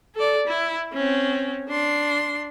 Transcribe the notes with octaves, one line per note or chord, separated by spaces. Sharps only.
A4 D5
E4
C4 C#4
D4 C6